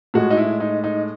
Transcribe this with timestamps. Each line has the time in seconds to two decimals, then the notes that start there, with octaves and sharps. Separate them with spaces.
0.14 A2 G#3 F#4
0.30 D#4
0.37 E4
0.60 D#4
0.84 D#4